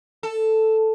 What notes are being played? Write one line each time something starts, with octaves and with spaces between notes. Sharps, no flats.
A4